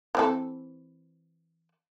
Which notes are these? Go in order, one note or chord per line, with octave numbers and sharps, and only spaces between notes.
E3 C4 A4